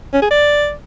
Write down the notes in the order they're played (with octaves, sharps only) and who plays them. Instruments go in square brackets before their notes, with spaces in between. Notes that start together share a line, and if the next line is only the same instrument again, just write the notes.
[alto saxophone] C#4
G#4
D5